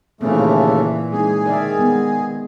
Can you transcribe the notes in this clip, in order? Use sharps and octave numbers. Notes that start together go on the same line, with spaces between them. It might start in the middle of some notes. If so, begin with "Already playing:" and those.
D#2 A#2 C#3 E3 A3 A#3 C4
G#3 C4 D#4 G#4
D#3 A#4 D5 E5
G#3 B3